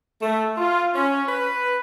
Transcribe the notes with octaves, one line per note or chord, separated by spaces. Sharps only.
A3
F4
C#4
B4